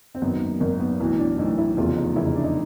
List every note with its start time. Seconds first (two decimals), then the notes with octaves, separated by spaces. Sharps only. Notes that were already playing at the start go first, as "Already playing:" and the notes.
0.15 C4
0.22 G#1 F#2 D#3 B3
0.41 A#3
0.60 G#1 F#2 D#3 A#3
0.80 B3
1.00 B1 A2 E3
1.18 D4
1.38 B1 A2 E3 D#4
1.58 E4
1.77 F1 E2 C#3 F4
1.96 D#4
2.16 F1 E2 C#3 E4
2.26 D#4
2.36 D4
2.44 D#4